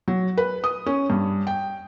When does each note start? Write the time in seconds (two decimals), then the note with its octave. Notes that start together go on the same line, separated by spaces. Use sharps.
0.08 F#3
0.37 B4
0.64 D#6
0.86 C#4
1.10 G2
1.47 G5